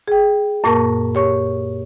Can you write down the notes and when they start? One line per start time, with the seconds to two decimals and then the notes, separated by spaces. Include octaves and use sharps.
0.07 G#4 G5
0.64 F#2 A#2 A#3 A#4 A5 C#6
1.15 G4 C#5 C#6